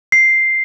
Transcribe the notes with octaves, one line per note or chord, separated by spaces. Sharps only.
C7